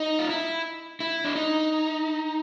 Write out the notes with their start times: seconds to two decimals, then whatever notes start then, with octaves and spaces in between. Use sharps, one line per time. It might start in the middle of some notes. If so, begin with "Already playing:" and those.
Already playing: D#4
0.19 F4
0.29 E4
1.00 E4
1.24 D4
1.35 D#4